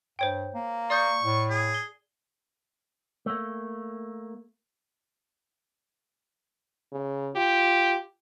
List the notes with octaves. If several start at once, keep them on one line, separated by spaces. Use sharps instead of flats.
G2 C5 C#5 G5
A#3
D5 C#6 D#6 G6
A2
G#4
G7
A3 A#3
C#3
F4 G4